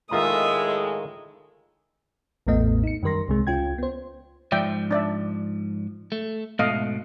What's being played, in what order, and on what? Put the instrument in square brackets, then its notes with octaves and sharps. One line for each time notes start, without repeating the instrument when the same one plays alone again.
[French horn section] A2 G#3 [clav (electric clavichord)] D#3 F4 A#5 [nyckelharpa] E5 D#6
[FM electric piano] A1 E2 A2 A3 B3 D#5
D#4 C#7
F#2 D#3 G3 A#4 C6 A#6
C2 C3 G#3
C#2 C#4 F4 G5 G#6
B3 C5
[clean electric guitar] G#2 F3 [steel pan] D5 E5 G5
[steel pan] D4 D5 E5
[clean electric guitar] A3
[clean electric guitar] G#2 B2 [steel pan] A3 D#5 F5